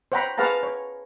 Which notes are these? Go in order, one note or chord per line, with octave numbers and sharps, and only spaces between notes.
C5 C#5 F#5 G5 A#5 B5
G#4 B4 F5 F#5 A5 A#5
C#5